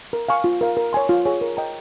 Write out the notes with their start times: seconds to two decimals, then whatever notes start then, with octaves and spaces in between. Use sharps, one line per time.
0.13 A#4
0.29 F5 G#5 C#6
0.44 F4
0.61 A#4 F5
0.77 A#4
0.93 C#5 G#5 C6
1.09 F4
1.26 G#4 C#5 G#5
1.41 A#4
1.57 D#5 G5 A#5